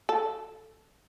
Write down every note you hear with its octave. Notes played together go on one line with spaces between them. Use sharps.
A4